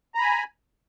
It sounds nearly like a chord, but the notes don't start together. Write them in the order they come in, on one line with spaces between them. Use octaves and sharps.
A#5 B5 G#5